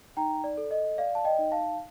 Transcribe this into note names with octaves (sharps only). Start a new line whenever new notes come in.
D#4 G5 A#5
D5
A4
D#5
D5 F5
A5
D#5 G5
D#4
F5 A5